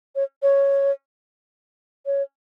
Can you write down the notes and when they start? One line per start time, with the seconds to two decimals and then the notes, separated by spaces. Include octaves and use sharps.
0.16 C#5
0.43 C#5
2.06 C#5